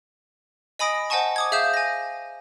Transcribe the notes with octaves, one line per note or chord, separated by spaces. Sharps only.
D#5 G#5 B5 D#6 A#6 D7
C5 D#5 F#5 G#5 A5 C#6
D6 D#6 G#6
G#4 E5 F5 D#6 G6 E7
G#5 A#6